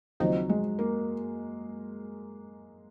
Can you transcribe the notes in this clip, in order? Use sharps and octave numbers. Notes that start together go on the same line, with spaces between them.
D#2 C#3 F3 F#3 C4 D#4
G#3
A#3